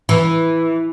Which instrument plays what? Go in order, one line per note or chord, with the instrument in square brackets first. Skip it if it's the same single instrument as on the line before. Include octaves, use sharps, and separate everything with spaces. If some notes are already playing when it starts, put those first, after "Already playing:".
[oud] E3